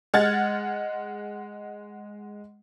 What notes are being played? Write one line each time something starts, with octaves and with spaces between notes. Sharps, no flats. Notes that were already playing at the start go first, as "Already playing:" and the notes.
G#3 F#5 F6 G#6 A6